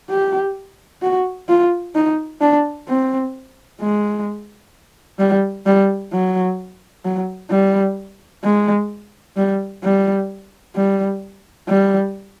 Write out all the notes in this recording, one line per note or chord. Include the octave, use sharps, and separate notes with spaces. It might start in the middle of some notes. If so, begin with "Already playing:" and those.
G4
F#4
F4
D#4
D4
C4
G#3
G3
G3
F#3
F#3
G3
G#3
G3
G3
G3
G3